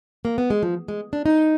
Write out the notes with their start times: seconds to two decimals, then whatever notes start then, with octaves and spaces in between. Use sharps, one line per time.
0.25 A#3
0.38 B3
0.50 G#3
0.63 F3
0.88 G#3
1.13 D4
1.26 D#4